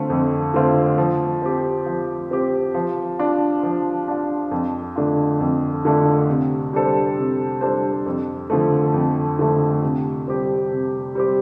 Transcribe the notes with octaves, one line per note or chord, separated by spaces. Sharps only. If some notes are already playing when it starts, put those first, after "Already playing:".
Already playing: D3 A3 C4 F4
F2
D3 A3 C4 F4
F3
C4 G4
F3
C4 G4
F3
D4 F4
F3
D4 F4
F2
D3 A3 D4 F4
F2
D3 A3 D4 F4
C3
G3 D4 A4 C5
C3
G3 D4 A4 C5
F2
D3 F3 A3
F2
D3 F3 A3
C3
G3 C4 G4
C3
G3 C4 G4